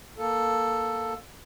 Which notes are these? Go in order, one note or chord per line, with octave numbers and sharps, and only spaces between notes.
A#3 A4